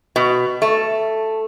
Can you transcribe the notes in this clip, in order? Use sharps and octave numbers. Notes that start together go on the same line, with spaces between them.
B2
A3